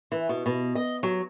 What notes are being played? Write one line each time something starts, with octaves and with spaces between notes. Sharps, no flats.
E3
B2
B2
D#5
F#3